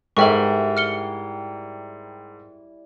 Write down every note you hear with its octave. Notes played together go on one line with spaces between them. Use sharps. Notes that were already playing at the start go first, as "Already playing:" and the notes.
G#2 G3 E4 A4 A#4 E5 G5 C#6
F6 C#7 G7